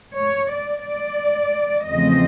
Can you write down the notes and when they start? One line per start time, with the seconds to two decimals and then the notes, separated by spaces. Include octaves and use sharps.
0.19 C#5
0.53 D5
0.87 D5
1.89 E2 C#3 F3 A3 C4 D#5